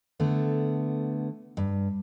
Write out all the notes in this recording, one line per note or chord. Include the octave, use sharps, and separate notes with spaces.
D3 A3 B3
G2